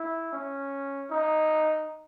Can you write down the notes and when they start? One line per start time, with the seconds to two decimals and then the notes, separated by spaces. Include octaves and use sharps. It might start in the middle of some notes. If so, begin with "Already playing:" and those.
Already playing: E4
0.33 C#4
1.11 D#4